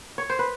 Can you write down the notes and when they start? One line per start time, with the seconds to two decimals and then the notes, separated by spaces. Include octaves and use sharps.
0.18 C#5
0.30 C5
0.39 B4